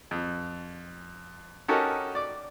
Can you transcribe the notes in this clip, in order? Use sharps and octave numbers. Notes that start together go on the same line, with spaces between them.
F2
C#4 D#4 F#4 G4 A4 A#4
D5 D6